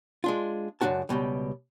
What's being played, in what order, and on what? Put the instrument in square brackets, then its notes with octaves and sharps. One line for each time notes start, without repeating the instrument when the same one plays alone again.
[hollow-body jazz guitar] G#3 D4 F4
C#2 F#2 A#3 D4 F#4 A5
C#2 F#2 B2 G3